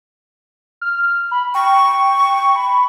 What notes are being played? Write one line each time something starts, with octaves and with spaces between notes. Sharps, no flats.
F6
B5
G5 C#6
B5